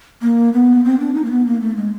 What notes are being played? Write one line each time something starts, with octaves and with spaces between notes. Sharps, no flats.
A#3
B3
C4
D4
D#4
A#3
B3
A#3
A3
G#3